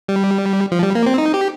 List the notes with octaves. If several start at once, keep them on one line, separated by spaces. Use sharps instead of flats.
G3
F3
G3
A#3
C4
D#4
G4